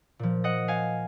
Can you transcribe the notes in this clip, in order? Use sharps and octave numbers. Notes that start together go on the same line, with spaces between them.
A#2 F3
D#5 F#5
F5 G#5